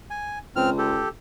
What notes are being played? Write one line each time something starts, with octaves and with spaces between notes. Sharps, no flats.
G#5
C#2 C4 F6
G4 A4